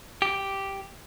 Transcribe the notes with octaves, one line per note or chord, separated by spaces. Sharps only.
G4